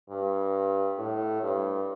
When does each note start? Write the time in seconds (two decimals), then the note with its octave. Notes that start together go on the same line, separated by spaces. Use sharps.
0.10 G2
0.98 A2
1.43 G2